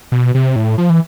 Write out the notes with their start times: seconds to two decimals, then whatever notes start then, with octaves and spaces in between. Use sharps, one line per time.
0.12 B2
0.34 C3
0.56 A2
0.78 F3
0.90 E3